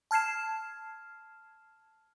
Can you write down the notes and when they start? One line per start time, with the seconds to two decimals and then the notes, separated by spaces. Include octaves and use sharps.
0.11 A5 F6 G#6 C7 E7